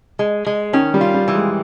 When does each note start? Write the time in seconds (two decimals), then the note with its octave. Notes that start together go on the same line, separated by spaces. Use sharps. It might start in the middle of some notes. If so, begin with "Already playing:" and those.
0.19 G#3
0.46 G#3
0.73 D#3 C#4
0.94 G3
1.01 F4
1.14 G3
1.28 E3
1.35 G#3